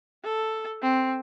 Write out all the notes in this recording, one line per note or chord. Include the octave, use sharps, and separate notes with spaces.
A4
C4